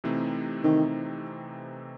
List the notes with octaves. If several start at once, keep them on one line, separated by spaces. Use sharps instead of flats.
C3 E3 A3 C4 D#4
C3 D#3 E3 A3 C4 D#4